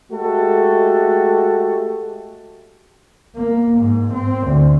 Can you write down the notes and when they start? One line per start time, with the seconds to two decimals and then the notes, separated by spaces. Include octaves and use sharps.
0.12 G#3 A3 F#4 G4 A4
3.35 A#3
3.78 G#2
4.13 C4
4.48 D2